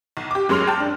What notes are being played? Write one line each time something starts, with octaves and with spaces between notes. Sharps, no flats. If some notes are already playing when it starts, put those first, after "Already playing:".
B1
G4 D6
F#2 F#3 G#3 C6 F6 F7
G5 A5
D4